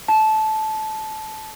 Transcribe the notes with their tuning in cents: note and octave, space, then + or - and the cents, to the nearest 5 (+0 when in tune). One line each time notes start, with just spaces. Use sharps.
A5 -15